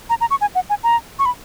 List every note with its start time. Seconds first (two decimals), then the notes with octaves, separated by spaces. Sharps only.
0.10 A#5
0.21 A#5
0.30 C#6
0.41 G#5
0.55 F#5
0.70 G#5
0.83 A#5
1.19 C#6
1.26 B5